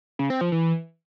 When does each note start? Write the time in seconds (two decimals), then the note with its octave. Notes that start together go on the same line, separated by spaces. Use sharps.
0.19 C#3
0.30 C4
0.41 F3
0.52 E3